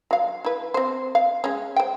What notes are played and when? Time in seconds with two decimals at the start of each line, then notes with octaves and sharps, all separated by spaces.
0.11 F#3 F5
0.45 E4 B4
0.74 C4 C5
1.15 F5
1.44 G#3 C#4
1.76 C5 G5